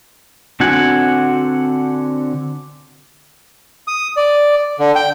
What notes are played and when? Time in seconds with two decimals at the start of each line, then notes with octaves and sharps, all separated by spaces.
0.60 D3 C4 F#4 F#5 G#5
3.88 D#6
4.17 D5
4.79 D3
4.95 G5